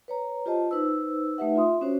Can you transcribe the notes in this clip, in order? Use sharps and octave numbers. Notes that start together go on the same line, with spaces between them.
B4 C#5 A#5
F4 G4 C5 D#5 A5
D#4 B4 C5 E6
A3 D#4 G4 B4 E5 F#5
F4 E5 C6 D#6
C#4 D4 F#4 C5 C#5